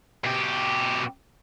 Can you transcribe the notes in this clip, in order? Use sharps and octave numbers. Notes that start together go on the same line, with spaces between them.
B2 G4